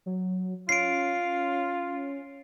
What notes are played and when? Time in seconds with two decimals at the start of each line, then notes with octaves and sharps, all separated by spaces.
0.06 F#3
0.69 C#4 F4 C7 D7